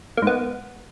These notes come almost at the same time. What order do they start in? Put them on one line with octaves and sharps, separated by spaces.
A#3 G#2 B3